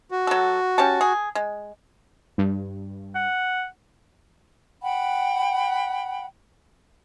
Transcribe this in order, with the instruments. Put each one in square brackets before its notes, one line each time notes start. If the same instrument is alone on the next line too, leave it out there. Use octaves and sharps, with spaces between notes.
[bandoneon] F#4
[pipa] F#3 A4
C#4 G4 A5
G#4
G#3
[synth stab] G2
[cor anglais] F#5
[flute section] F#5 G5 B5